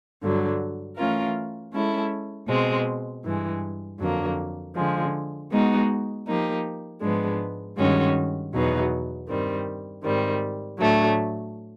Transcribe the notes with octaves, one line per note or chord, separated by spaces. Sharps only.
G2 D3 F#3
E3 A3 C#4 F4 A#4
G#3 C#4 E4 A4
B2 G#3 C4
G2 E3 G#3
F2 D3 F#3 A#3 D4
D3 F3 G#3
G#3 B3 D#4 F#4
F3 A#3 D#4 G4
G#2 F3 G#3 B3 D4
G2 D#3 G#3 C#4 F#4
E2 B2 F#3 B3 D#4
G2 D#3 G3 C4
G#2 D#3 G3 C4
A2 F#3 A3 D4